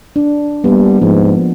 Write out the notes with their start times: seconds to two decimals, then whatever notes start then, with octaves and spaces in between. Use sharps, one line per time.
0.16 D4
0.64 G3 A#3 B3
1.02 G#2 F3